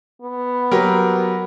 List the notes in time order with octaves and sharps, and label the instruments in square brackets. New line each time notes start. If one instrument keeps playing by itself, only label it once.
[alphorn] B3
[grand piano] F#3 G4 A#4